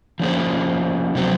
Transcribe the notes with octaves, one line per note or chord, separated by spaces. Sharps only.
F3 A#3 C#4 G#4 C5
C3 F#3 C4 F#4 C5